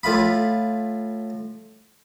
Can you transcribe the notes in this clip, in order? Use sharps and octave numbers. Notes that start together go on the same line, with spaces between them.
A2 F4 B5